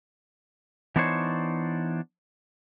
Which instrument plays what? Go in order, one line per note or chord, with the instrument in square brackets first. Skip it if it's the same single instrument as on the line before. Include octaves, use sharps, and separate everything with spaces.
[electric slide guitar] E3 B3 D4 D#4 C5 C#5